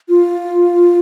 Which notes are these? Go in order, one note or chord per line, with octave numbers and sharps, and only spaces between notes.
F4